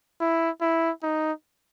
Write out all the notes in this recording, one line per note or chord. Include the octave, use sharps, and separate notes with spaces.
E4
E4
D#4